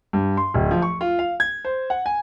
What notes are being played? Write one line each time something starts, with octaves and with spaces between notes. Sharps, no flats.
G2
C6
D1
F3
C#6
F4
F5
G#6
C5
F#5
G#5